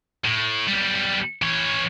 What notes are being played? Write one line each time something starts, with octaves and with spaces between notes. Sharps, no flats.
A2
B1 G3
E3 C#5